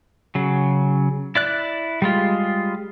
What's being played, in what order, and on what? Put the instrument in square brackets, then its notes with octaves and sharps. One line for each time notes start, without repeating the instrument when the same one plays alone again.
[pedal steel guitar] C#3 F#3
E4 D5 F#6
G3 G#3 F4